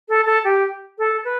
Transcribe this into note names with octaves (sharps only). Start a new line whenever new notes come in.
A4
A4
G4
A4
B4